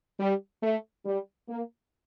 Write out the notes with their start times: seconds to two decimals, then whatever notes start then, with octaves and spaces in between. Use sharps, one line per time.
0.20 G3
0.63 A3
1.05 G3
1.48 A#3